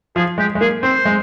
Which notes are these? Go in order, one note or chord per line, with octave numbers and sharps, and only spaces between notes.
F3 G#4
G#3 G4
G#3
A#3 G#4
C4 C5
G#3